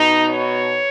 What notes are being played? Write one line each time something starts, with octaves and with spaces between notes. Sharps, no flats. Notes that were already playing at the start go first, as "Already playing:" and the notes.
Already playing: B2 D#4
C#5